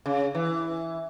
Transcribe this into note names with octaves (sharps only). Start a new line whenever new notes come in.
C#3
E3